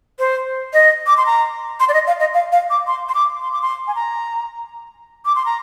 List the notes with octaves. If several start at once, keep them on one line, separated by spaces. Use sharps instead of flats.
C5
D#5
D6
C6
A#5
C6
D5
D#5
F5
D#5
F5
F5
D6
C6
C6
D6
C6
D6
C6
G#5
A#5
D6
C6
A#5